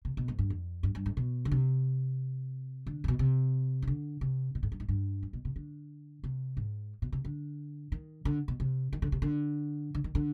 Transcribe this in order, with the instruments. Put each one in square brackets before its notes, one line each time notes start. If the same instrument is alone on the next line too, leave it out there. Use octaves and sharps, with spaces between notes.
[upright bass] C3
B2
G#2
G2
F2
G2
G2
G#2
B2
D3
C3
D3
G#2
B2
C3
D#3
D3
C3
B2
G#2
G2
G#2
G2
F2
B2
C3
D3
C3
G#2
B2
C3
D3
D#3
D3
B2
C3
D#3
D3
C3
D3
D3
D#3
D3